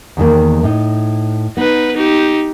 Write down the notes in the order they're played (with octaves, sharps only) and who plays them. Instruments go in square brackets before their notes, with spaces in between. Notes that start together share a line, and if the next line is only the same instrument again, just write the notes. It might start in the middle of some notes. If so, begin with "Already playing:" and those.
[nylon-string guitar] E2 D#3 A#3
A2 D#4
[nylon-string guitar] B3 [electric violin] D#4 B4
[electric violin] D#4 G4